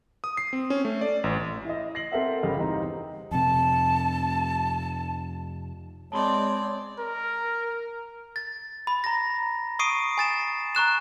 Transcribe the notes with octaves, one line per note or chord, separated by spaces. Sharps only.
D#6
C7
C4
C#4
A3
D5
A1
E4 D#5
A#6 C7 F#7
C4 A4 A#4 E5 F#5
G1 C#3 G3 D#5 F5
E2 C3 C4 D#4 A#5
F2 C3 A5
G#3 C4 C#5 D5 A5 B5 C6
A#4
A6
B5
A#5 A#6
C#6 D#6 C7 D7 D#7
G#5 A6 E7
A#5 C#6 F#6 E7